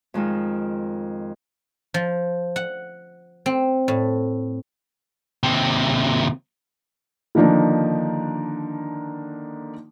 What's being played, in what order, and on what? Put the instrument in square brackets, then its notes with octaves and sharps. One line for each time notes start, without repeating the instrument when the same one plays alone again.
[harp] F2 D#3 G#3 F4
[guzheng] F3
F#5
C4
A2
[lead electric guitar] D#2 C3
[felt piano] D3 D#3 F3 A#3 D4 D#4